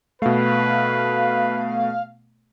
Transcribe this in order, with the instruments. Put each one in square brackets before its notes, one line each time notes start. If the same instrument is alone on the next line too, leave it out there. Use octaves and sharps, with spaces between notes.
[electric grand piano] B2 A3 [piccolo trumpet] B4 [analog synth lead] F5